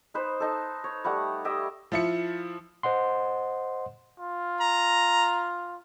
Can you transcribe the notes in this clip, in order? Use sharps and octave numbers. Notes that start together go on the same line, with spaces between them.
D#4 B4 C5
D#4 A4
C#5
G3 A3 F#5 B5
G4 D#5 E5 G5
F3 E4 C#7
C5 D#5 F#5 C6
F4
A#5